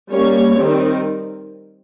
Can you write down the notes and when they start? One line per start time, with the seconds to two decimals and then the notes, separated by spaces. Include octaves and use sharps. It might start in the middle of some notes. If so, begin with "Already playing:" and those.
0.11 G3 A#3 C#4 C#5
0.57 D#3 G3 C4